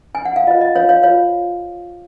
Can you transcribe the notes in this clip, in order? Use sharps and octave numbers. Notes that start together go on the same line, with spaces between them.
G#5
F#5
F5
F4 C5 D#5
D#5
F4 C5 C#5 F5
C#5 F5
F4 C5 C#5 F5